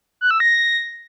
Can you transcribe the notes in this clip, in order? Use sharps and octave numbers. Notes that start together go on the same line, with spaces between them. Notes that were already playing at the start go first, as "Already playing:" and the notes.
F#6
E6
A#6